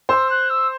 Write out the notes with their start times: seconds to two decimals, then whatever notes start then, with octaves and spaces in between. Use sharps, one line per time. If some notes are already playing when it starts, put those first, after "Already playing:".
0.09 C5 E6
0.30 F#6
0.49 E6